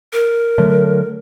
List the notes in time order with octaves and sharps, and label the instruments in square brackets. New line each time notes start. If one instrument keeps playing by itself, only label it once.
[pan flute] A#4
[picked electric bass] D3 F#3 A3